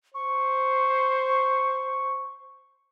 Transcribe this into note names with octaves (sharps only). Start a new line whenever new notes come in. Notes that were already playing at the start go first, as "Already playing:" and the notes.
C5 C#6